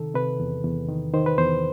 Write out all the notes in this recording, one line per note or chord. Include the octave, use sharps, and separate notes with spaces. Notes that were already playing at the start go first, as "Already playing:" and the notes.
Already playing: C3 D#3 A4
C3 B4
E2
E2
D#3
D#3 C5
B4
E2 C5